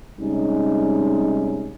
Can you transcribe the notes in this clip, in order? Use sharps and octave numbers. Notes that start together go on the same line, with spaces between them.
C3 G3 G#3 C#4 D#4